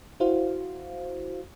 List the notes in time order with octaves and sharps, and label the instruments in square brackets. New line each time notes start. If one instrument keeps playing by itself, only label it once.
[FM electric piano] E4 F#4 C5 F5